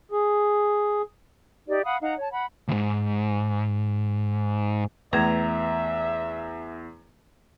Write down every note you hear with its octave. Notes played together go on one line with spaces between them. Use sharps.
G#4
D#4 G4 D5
F5 F#5 B5 D#6
D#4 F5 F#5 A#5
C#5 A5
F#5 B5
D2 G#2
E2 A3 B4 E5 A#5